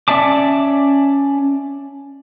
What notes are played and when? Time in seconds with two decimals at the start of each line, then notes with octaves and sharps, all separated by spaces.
0.08 C#4 D5 E5 A5 D6